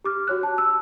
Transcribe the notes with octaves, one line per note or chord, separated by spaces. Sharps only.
G4 D6 F6
F#4 C#5 F#6
A5
E6